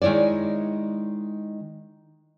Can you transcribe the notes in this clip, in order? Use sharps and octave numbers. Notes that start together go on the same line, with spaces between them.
D#3 G#3 E4 C#5 D5